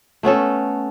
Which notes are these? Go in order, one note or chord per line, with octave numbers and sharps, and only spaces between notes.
A3 B3 C#4 A4